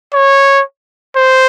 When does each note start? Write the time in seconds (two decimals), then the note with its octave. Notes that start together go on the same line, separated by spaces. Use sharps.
0.14 C#5
1.16 C5